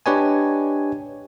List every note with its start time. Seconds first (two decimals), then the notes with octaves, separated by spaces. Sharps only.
0.06 D4 G4 B4 C#5 D#5 G#5